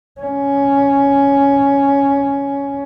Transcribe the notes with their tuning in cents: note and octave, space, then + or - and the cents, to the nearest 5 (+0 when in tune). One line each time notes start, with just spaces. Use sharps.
C#4 +10